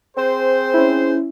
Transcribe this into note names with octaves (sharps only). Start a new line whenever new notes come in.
C4 G#4 C5
C#4 E4